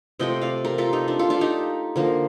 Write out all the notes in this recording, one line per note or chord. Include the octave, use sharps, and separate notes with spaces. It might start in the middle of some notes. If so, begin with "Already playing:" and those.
C3 F3 A3 C4 D#5 G5
D5 F5
G4 A#4
F4 A4
D#4 G4
D4 F4
F4 A4
D4 F4
D#4 G4
D3 F3 A#3